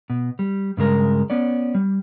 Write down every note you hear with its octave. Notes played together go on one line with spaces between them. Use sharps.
B2
G3
G2 C#3 G#3 A#4
B3 C#4 D5
G3